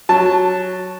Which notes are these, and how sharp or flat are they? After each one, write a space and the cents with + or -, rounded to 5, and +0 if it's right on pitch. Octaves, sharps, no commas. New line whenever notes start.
F#3 +0 A5 +0